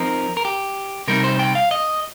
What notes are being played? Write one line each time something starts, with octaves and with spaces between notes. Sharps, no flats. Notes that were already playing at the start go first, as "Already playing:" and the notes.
Already playing: F3 C4 D#4 A#4
A#4
G4
C3 G3 C4 D#4 A#4
C5
G5
F5
D#5